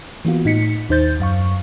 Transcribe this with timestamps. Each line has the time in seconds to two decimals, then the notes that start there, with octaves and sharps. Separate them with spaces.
0.25 E3 A#3 B3 F4 F#4
0.45 A2 D#4 B6 C#7
0.89 D#2 D#4 C5 G6 A6
1.20 F#2 F5 C#6